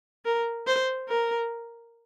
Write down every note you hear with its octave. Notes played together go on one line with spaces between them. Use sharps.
A#4
C5
A#4